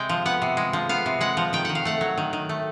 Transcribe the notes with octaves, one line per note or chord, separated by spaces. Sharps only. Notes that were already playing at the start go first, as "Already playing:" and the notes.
Already playing: C3 G#3 G5
F3
B3 F#5
C3
G#3
F3
B3 F5
C3
G#3 F#5
F3
D#3 G5
D#3 F#5
F5
A3 F#5
F#3
D#3
D#3
A3